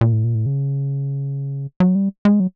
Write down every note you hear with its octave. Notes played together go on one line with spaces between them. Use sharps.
A#2
A2
A#2
A2
C#3
F#3
G3
G#3
F#3